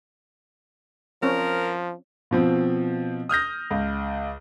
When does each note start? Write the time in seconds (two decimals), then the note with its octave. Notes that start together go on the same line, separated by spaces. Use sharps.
1.23 F3 C4 C#4 A#4
2.31 B2 F3 C4
3.29 D#6 F6 G6 A#6
3.71 C#2